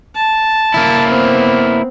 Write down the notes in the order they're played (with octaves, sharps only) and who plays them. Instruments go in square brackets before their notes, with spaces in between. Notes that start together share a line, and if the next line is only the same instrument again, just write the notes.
[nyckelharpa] A5
[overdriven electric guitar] A#3 E4
[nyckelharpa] B3 C4